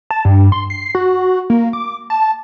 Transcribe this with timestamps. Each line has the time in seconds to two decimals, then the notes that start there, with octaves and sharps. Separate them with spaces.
0.11 A5
0.25 G2
0.52 C6
0.70 C7
0.95 F#4
1.50 A#3
1.73 D6
2.10 A5